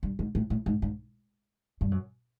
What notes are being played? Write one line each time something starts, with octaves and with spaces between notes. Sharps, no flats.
G2
G#2
A2
A2
G#2
G#2
G2
F#2